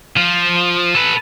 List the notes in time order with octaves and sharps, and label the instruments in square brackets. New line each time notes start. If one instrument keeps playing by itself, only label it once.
[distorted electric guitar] F3
A4 B4